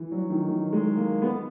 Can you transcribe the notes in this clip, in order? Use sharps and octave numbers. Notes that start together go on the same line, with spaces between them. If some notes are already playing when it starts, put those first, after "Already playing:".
Already playing: E3
F#3
D#3
D#3
G#3
A#3
B3